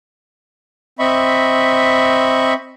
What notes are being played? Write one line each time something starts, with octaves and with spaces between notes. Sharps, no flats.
C4 D#5 E5 B5 C#6